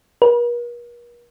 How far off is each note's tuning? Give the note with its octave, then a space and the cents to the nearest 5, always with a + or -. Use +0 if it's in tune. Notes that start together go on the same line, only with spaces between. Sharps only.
A#4 +45